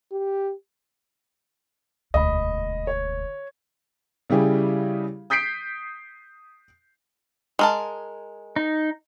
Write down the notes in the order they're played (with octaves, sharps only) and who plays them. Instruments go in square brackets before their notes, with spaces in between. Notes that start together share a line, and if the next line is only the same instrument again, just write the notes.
[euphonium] G4
[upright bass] E1 D2 [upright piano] D#5 B5
[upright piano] C#5
[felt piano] C#3 G3 E4 G4 G#4
D#6 G6 B6 C7 D7
[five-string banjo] G#3 A#4 A5
[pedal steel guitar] D#4